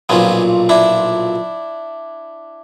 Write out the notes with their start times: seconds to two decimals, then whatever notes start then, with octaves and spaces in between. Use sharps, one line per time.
0.09 B1 A#2 F3 B3 C#4
0.69 D4 E4